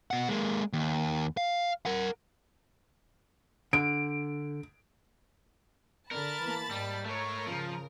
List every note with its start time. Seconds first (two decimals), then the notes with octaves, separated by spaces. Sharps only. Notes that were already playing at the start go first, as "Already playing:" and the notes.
0.11 B2 F#5
0.29 G#3 A#3
0.73 D#2
1.37 F5
1.86 A#4 F#5
3.73 D3 D7
6.11 D3 A#4 A5 B5 A6
6.43 E3 A#3
6.71 G#2 G3
7.06 A3 A#4 C#5
7.47 C#3 F3